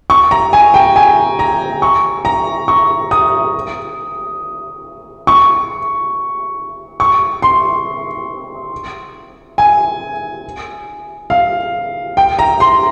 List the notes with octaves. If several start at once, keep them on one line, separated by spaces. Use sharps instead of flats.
C#6
A#5
G#5
G5
G#5
A#5
C#6
A#5
C#6
D#6
C#6
C#6
C6
G#5
F5
G5
A#5
C6